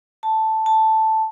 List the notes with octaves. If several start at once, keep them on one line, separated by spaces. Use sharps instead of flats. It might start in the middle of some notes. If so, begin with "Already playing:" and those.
A5
A5